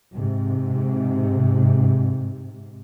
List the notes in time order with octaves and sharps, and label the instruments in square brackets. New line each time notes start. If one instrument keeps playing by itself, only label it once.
[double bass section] G#2 C3